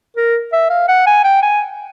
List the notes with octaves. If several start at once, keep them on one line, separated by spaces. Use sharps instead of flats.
A#4
E5
F5
F#5
G#5
G5
G#5